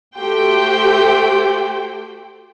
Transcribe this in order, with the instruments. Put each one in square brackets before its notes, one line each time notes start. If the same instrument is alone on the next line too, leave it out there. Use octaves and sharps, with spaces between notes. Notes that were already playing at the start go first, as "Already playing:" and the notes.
[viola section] A3 F#4 G4 C5 G5